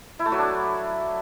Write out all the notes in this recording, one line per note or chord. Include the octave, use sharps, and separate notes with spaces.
E4
A3
F#3
D4